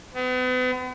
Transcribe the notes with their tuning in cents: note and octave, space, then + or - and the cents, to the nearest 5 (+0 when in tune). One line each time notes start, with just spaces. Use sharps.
B3 +40